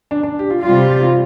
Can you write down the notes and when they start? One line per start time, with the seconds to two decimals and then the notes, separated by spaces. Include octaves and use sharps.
0.11 D4
0.23 D4
0.39 G4
0.50 F4
0.63 C3 G3 F4
0.77 G4
0.90 G4
1.03 F4